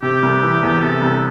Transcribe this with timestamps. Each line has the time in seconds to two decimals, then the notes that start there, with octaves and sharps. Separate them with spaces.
0.02 C3 G4
0.23 C2
0.42 E3
0.62 E2
0.82 C3 A4
1.02 C2